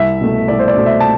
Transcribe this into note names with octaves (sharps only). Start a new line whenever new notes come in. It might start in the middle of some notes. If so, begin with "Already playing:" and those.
Already playing: C2 E5
B2 A3
C2 D5
C5
D5
B2 A3
E5
A5